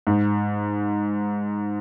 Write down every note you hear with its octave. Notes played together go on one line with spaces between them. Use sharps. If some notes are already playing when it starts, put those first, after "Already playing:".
G#2